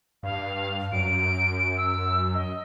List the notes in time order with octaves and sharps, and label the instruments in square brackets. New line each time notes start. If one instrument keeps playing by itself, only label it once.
[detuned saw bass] G2 [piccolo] F5
[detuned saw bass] F#2 [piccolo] D7
[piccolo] E6
D#5